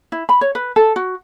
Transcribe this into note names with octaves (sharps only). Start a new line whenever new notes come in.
E4
B5
C#5
B4
A4
F#4